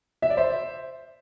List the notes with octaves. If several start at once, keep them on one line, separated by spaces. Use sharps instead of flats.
E5
D5
C5 E5